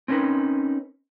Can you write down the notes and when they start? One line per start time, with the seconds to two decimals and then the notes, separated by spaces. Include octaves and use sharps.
0.08 C4 C#4 D#4 A#4 B4